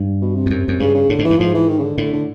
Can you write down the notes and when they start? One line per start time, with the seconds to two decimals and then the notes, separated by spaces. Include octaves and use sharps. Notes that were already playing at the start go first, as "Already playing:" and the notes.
Already playing: G2
0.21 B2
0.35 C3
0.46 F2
0.50 F#2 C3
0.68 F#2
0.80 G2 C#3
0.94 C#3
1.09 A2 D3
1.19 G#2
1.24 E3
1.30 G2
1.38 G#2 F3
1.54 E3
1.68 D#3
1.79 C#3
1.83 D3
1.98 A2 D3
2.13 D3